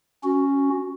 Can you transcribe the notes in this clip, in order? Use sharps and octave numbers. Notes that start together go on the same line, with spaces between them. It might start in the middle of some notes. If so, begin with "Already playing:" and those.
C#4 F#4